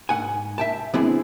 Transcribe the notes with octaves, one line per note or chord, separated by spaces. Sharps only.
G#2 F#5 G#5
E5 G5 A5
D3 B3 C4 E4 G#4